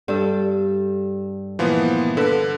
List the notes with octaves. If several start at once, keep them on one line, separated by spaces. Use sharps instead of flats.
G2 A4
A#2 E3 F3 B3
D3 A4 B4